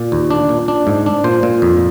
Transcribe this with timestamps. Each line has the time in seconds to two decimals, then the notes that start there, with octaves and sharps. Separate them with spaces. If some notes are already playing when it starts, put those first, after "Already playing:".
Already playing: A#2 D5
0.12 D#2
0.31 D4
0.49 A#2
0.68 D4
0.87 G#2
1.06 D4
1.24 A#2 C5
1.43 A#2
1.62 F2